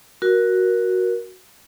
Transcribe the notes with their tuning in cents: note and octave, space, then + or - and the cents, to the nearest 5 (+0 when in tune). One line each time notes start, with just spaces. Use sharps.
F#4 +0 A#4 +15